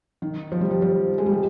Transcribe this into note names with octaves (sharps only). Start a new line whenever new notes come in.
D#3
F3
G3
F3
F3
G#3
G3
G#3